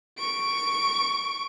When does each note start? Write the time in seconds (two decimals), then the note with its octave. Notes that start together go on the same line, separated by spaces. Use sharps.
0.18 C#6 D7